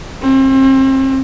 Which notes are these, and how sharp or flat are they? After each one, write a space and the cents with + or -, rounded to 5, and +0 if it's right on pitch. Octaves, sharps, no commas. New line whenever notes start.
C4 +35